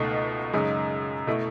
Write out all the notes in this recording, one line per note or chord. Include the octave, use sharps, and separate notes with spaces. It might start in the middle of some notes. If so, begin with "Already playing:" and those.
Already playing: C#2 B2 A3 D#4
F#2 C#3 G#3 D#4
B2 A3 E4